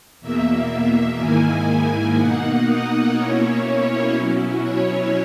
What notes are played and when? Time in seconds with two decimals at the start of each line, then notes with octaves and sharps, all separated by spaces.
0.21 E2 B2 A#3 E5
0.70 E5
1.19 G#2 D#3 A#3 E4 G#5
1.69 G#5
2.18 B2 A#3 D#4 F#5
2.68 D#5
3.16 B2 A#3 C#4 E4 C#5
4.16 B2 F#3 C#4 E4
4.65 C#5